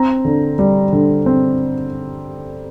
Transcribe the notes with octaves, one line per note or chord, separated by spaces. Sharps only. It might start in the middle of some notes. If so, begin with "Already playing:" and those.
Already playing: C4 A#5
D3
G3
D3
C4